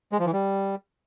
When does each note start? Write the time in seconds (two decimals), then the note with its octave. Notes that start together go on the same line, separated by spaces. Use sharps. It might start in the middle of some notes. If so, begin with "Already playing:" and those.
0.12 G#3
0.19 F3
0.26 E3
0.33 G3